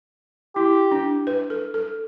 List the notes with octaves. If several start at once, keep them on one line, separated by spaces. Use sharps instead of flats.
E4 G4
D4
B4
A4
A4